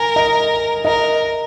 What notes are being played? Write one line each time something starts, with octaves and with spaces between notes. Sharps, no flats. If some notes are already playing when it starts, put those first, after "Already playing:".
Already playing: A#4 G#5
D#5
A#4 D#5